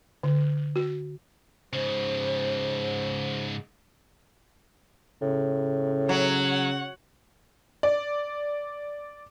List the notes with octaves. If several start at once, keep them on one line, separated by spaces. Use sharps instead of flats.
D3
F#4
G#2 C#3 C5
A2 C#3
F#3 C#5 F#5
D5